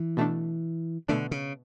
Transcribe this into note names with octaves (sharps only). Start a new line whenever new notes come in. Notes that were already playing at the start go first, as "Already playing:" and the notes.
Already playing: E3
B2 A3 D4
B2 D3 A3 D4
C#3